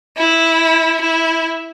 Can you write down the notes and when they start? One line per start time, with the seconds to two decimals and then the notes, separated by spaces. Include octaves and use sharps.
0.17 E4
1.01 E4